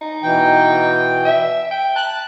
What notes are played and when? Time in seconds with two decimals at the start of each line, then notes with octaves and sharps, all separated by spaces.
0.02 D#4
0.23 B2 E3 G5
1.25 E5
1.71 G5
1.96 A5 F#6